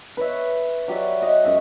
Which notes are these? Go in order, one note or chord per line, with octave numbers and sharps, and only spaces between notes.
B4 C#5 E5
F#3 G4 D5 E5
F#4 D#5
F#2 G#3 E5 C#6